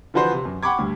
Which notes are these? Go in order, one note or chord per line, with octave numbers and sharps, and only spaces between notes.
D3 E3 F3 F#4 B4 C5
C3
F#2
F#5 G5 B5 C#6 D6 G#6
D2 G2